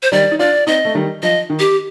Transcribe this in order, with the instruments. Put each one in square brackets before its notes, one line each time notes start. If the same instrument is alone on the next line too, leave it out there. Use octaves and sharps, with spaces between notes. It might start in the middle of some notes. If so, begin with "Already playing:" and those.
[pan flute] C5
[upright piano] D#3 G3 [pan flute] D5
[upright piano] D#4
[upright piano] D4 F4 [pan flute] D5
[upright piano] C4 D#4 [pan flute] D#5
[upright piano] A3
D#3 G3
[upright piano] F3 [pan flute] D#5
[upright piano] D#3
[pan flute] G4